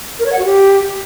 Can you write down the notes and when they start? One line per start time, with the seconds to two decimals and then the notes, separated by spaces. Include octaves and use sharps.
0.19 A#4
0.26 C#5
0.32 F#5
0.39 F#4
0.45 G4